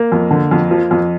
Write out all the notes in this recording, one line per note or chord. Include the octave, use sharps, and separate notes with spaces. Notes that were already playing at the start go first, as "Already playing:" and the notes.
Already playing: A#3
F2
D3
F2
F3
F2